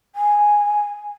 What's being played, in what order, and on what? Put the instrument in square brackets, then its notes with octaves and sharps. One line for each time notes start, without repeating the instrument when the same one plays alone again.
[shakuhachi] G#5